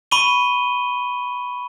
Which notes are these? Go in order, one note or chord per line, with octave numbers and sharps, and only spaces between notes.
B5 C#6 D#7 G7